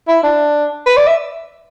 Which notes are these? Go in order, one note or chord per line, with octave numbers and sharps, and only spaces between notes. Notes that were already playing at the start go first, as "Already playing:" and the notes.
E4
D4
B4
D5
E5